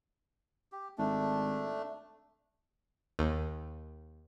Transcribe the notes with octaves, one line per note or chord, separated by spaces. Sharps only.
G4
G#1 A3 D4
D#2